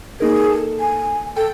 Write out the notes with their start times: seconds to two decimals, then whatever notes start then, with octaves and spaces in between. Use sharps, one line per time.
0.20 A#3 D#4 G#4 A#4
0.50 A4
0.80 G#5
1.37 A4 G5